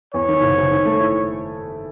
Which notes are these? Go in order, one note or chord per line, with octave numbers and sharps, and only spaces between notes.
E2 C#5
D#3
F#1
F#1
D#3
A3
E4